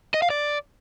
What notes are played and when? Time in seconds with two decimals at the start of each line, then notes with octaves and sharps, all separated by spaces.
0.14 D#5
0.22 F5
0.30 D5